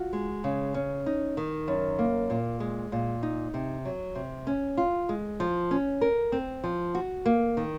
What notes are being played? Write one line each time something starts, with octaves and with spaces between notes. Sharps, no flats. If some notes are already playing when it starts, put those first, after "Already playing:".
Already playing: F4 F#4
G#3
C#3
C#4
D#4
D#3
F#2
A#3
A#2
G#3
A#2
D#4
C3
F#3
C3
C#4
F4
G#3
F3
C#4
A#4
C4
F3
F#4
A#3
D#3